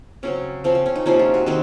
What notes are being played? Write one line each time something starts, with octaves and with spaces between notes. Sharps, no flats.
C#3 F#3 C4 C#4
C#3 F3 C4 C#4
C4
C#4
D#4
C3 F3 A#3 C#4
F4
F#4
D#3 G#3 C4 G#4